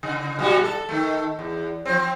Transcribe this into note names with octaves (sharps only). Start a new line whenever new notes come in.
C#3
A#2 G3 F#4
A4
D#3 A3
E2
F3 C4